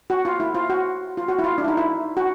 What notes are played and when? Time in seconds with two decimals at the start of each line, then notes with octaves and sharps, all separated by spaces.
0.10 F#4
0.25 F4
0.40 E4
0.54 F4
0.70 F#4
1.17 F4
1.28 F#4
1.39 E4
1.44 F4
1.58 D4
1.64 E4
1.68 D#4
1.77 E4
2.17 F#4